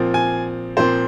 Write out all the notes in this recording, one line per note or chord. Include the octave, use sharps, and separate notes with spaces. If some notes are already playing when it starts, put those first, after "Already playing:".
Already playing: A#2 F3 C4
G#5
A#2 F3 C4 C5